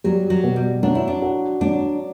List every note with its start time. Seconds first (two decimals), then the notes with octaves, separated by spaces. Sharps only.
0.04 F#3 G3
0.30 F#3
0.44 B2
0.56 G3
0.83 F#3 D4
0.95 E4
1.08 D4
1.22 F#4
1.61 F#3 D4